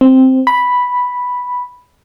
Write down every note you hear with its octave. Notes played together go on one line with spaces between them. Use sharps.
C4
B5